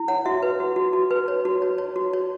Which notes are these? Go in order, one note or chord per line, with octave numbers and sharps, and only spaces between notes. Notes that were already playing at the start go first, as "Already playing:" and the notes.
Already playing: E4
C#5 F#5
F#4 E5
B4
F#4
F#4
F#4
B4
C#5
F#4
C#5
C#5
F#4
C#5